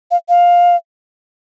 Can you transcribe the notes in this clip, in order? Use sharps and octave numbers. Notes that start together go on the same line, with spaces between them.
F5
F5